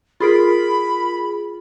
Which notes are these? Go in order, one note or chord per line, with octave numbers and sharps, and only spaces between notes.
F4 G#4 A#4 B5